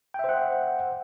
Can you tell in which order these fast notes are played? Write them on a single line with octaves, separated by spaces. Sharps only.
G5 E5 C5 F#5